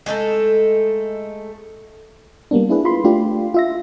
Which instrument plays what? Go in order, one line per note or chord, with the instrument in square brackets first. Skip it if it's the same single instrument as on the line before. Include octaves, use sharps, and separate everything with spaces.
[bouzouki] G#3 A3 D#4 A4
[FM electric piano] G3 A#3 B3 D4
D4 E4 G#4 B4
F4 B5 C6
A3 D4 F4 G4
F4 E5 A#6